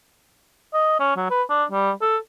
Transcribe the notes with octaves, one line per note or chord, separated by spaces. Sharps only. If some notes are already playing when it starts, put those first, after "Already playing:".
D#5
C#4
F#3
B4
D4
G3
A4